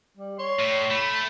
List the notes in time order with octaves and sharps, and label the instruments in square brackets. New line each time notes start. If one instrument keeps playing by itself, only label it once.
[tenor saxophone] G3
[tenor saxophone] C#5 [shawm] C6
[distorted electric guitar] A2
[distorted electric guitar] A3 [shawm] B5